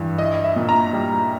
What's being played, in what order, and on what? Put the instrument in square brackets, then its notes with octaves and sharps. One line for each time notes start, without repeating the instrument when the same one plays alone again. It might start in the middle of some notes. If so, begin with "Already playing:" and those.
Already playing: [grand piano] G2 E3
[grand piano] E4 [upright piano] D#5
[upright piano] E5
[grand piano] A#2
[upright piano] A#5
[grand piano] G3